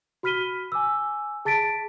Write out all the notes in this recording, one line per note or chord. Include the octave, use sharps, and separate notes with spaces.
F#4 B5 F6 B6 D#7 G7
G#5 D6 E6
G#4 A5 A6 B6 D7